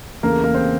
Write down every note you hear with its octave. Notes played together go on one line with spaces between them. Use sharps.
E2 C#3 E3 A3 A#3 A#4
A#3 A#4
C4 C5